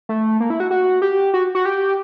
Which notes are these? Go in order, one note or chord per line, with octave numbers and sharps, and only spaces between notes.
A3
A#3
E4
F#4
F#4
G4
F#4
F#4
G4